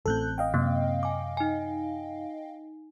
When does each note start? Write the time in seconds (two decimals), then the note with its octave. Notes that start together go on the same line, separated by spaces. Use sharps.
0.06 A1 A2 C4 A4 F#6 G6
0.38 D#5 F5 G5
0.54 F#2 C3 A#3 C4
1.03 G#5 D6
1.37 D#4 G#5